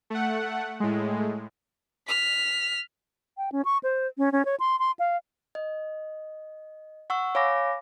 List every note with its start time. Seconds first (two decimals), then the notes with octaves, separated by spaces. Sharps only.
0.10 A3 F#5
0.80 A2 G#3
2.08 F6 B6
3.38 G5
3.52 C#4
3.65 C#6
3.83 C5
4.18 C#4
4.32 C#4
4.45 C#5
4.60 C6
4.79 C6
4.99 F5
5.55 D#5
7.10 F#5 C#6 E6
7.35 C#5 F5 G#5 B5 D6 A#6